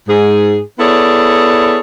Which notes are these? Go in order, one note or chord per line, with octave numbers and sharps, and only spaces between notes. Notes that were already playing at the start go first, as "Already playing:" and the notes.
G#2 G#4
B3 E4 G#4 A4 C#5 D5